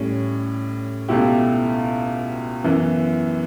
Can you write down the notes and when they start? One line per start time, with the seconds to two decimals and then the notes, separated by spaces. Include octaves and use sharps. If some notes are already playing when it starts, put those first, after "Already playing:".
Already playing: A2 G3 C#4
1.09 C#2 B2 A3 E4 G4
2.64 F#2 E3 B3